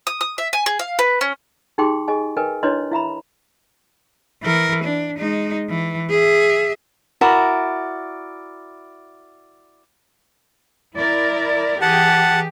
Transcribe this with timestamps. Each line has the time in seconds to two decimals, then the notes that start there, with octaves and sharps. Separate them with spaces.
0.07 D#6
0.21 D#6
0.38 E5
0.53 G#5
0.66 G#4
0.79 F5
0.99 B4
1.21 C#4
1.78 D#4 G4 G#4 G5 C6 D6
2.08 G#4 D#5 G#5
2.37 A#4 B4 D#5 G5 G#5
2.63 D4 E4 B4 C#5 D#5 C6
2.92 E4 E5 A#5 B5
4.43 E3 A#4
4.84 D4
5.18 G#3 D#4
5.70 E3
6.10 G#4 E5
7.21 E4 F#4 A#4 D5
10.96 E4 A#4 D5
11.82 E3 G4 G#4 F#5 A5